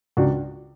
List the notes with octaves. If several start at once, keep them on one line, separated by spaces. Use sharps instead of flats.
C#2 D4 F#4